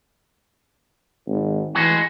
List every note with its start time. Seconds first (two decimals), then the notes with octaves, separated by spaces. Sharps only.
1.27 G#1
1.75 A2 E3 G#3 F#4